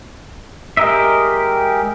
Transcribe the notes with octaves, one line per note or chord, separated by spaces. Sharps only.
G#3 G4 A#4 D#5 E5